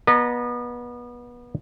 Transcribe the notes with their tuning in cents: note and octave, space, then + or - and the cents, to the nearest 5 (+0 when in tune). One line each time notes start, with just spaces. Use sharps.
B3 -25 D#5 -35 A#5 +0